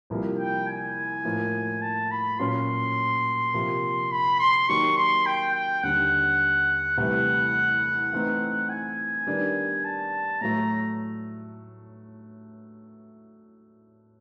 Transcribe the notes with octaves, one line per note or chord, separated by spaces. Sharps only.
C2 C3 F3 A#3
G5
G#5
A2 F3 A#3
A5
B5
A#2 F#3 A#3 C#4 F4 C6
C3 F3 A#3
B5
C6
D#3 F#3 A#3 D#4 G4 C#6
C6
G5
G5
D#2 D3 G3 F#5
C2 C3 E3 A3 F#5
E3 A3 C4 D#4
G#5
D#3 G3 B3 D4
A5
A2 F#3 A3 A#5